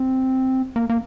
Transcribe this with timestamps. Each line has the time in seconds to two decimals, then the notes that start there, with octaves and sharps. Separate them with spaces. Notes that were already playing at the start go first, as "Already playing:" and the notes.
Already playing: C4
0.76 A#3
0.90 A#3